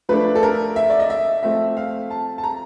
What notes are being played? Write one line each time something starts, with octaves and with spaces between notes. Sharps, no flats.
F3 A3 D4 B4
A4
A#4
E5
D5
D#5
E5
F3 A3 C4 E5
F5
A5
A5
A#5